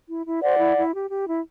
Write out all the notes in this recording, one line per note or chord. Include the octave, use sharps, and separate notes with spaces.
E4
E4
C5 D5 F#5
E4
E4
G4
G4
E4